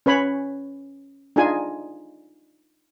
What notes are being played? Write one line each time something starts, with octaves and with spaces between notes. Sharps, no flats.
C#4 B4 C#5 B5
D4 D#4 F4 G#4 G#5